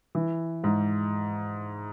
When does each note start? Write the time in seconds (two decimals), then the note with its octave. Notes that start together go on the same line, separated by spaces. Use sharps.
0.15 E3
0.64 G#2